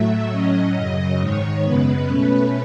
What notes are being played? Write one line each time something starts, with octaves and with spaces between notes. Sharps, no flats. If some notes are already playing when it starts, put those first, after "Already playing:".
Already playing: A2 F#3 A3 E5
A2 F#3 C#4 D#5
F#2 C#3 F#3 D#5
G#2 D#3 G#3 C#5
F#2 C#3 G#3 B3 B4
B2 A3 C#4 B4